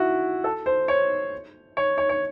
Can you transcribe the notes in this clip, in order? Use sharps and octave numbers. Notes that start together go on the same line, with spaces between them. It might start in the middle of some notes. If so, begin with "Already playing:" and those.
Already playing: E4 F#4
A4
C5
C#5
C#5
C#5
C#5